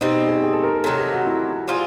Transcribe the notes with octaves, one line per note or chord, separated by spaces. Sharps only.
B2 G3 C4 D#4
G#4
G#4
A4
A#4
A#4
C3 D#3 F#3 A4
G#4
F#4
E4
G3 C4 F4 G#4